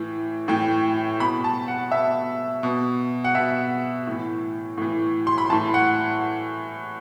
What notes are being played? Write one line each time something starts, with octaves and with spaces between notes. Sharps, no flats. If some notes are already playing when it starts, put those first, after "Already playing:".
Already playing: A2 E3
A2 E3 G5
B2 B5
A5
F#5
B2 E5
B2
F#5
B2 E5
A2 E3
A2 E3
C6
B5
A2 E3 A5
F#5